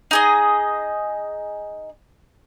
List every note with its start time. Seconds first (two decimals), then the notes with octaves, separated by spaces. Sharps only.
0.11 D#4 G#4 D#5